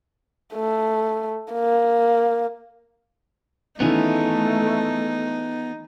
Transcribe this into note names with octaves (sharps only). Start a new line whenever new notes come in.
A3
A#3
D#3 E3 A3 B3 C#4 D#4 F4 G#4